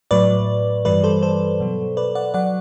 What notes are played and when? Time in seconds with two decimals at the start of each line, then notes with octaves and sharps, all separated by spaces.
0.11 A2 F#3 B4 D5
0.85 G2 E3 G3 B4 D5
1.04 A4 C5
1.23 A4 C5
1.60 B2 F#3
1.97 B4 D5
2.15 D5 F#5
2.34 F#3 D5 F#5